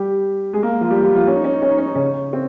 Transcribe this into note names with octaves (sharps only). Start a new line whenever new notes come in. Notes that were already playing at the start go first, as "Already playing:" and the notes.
Already playing: G3 G4
G#3 G#4
A#3
F3 F4
G3 G4
F3 F4
F3 F4
C#4
D#4
C#4
D#4
C#4
D#4
C#4
D#4
C#3 C#4
C4